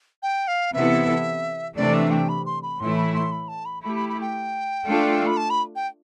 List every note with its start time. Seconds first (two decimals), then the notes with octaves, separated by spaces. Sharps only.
0.23 G5
0.48 F5
0.74 C3 E3 B3 E4 A4 E5
1.77 C3 E3 A3 D4 D5
1.94 E5
2.11 G5
2.29 B5
2.46 C6
2.62 B5
2.80 A2 E3 A3 E4 C6
2.97 B5
3.14 C6
3.32 B5
3.48 A5
3.65 B5
3.83 A3 E4 G4 B5
3.96 B5
4.09 B5
4.21 G5
4.85 A3 D4 F4 A4
5.26 B5
5.37 A5
5.50 B5
5.75 G5